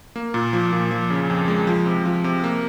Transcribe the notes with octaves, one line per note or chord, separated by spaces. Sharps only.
A#3
A#2
F3
A#2
F3
C#3
F2
G#3
F3
C3
F3
C3
A#3